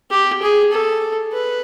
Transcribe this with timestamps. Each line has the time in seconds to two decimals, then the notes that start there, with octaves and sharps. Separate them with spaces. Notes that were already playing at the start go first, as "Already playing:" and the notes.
0.11 G4
0.42 G#4
0.71 A4
1.32 B4